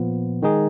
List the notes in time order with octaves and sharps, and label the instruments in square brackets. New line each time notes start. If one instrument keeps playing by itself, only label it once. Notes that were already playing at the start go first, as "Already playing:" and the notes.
Already playing: [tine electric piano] A#2 F3 B3
D#3 G#3 D#4 G#4